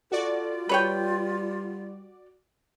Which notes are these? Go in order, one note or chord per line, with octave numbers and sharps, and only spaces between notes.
F4 F#4 A4 D5
G3 B4 C#5 G5